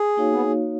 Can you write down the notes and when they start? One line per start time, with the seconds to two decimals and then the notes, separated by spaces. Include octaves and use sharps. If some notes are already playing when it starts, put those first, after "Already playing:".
Already playing: G#4
0.17 A#3 D#4 F#4 C#5 F5
0.32 B3